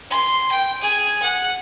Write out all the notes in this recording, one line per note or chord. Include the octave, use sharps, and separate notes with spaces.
C6
G5
G#4
F#5